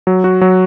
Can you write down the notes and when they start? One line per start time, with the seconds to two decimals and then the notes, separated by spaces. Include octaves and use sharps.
0.07 F#3
0.24 F#4
0.41 F#3